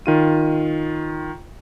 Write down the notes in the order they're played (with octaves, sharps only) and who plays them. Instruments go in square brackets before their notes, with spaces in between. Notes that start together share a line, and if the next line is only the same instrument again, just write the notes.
[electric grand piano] D#3 F4 D#7